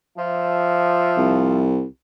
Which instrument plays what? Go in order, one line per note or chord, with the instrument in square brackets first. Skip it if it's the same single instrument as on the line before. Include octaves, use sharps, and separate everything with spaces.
[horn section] F3 E5
[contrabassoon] C2